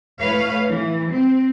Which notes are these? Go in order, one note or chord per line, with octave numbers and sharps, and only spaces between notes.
A2 B4 C#5 F5
E3
C4